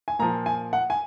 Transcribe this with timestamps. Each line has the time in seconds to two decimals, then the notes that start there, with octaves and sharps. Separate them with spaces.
0.08 G#5
0.19 A#2 F3 A#5
0.46 G#5
0.73 F#5
0.90 G#5